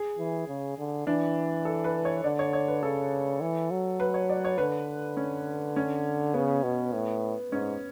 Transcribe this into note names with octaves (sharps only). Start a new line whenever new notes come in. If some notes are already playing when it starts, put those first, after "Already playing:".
Already playing: G#4
E3
C#3
D3
E3 D4
A4
B4
C#5
D3 D5
C#5
C#5
B4
C#3 A4
E3
F#3
B4
C#5
D5
C#5
D3 B4
C#4
C#4
C#3 B3
B2
A2
G#2 C#4